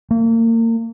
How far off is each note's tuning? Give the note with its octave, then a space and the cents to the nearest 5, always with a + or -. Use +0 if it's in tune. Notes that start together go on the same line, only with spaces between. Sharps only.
A#3 -35